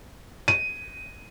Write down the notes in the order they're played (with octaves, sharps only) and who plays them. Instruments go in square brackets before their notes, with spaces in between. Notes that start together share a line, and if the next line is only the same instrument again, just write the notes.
[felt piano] D#7